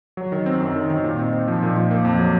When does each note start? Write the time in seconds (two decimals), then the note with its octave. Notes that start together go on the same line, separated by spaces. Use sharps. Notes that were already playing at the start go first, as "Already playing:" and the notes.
0.17 F#3
0.32 D#3
0.46 C4
0.60 F#2
0.76 D#3
0.90 D#3
1.04 A#2
1.19 C4
1.33 C4
1.48 F3
1.63 A#2
1.77 F3
1.91 A#3
2.05 F2
2.19 F#3